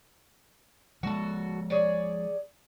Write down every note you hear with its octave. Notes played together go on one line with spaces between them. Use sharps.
F3 G#3 F#4 A4
G#4 C#5 D5